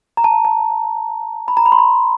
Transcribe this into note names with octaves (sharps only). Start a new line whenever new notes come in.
A#5
A5
A5
B5
A#5
B5
C6
B5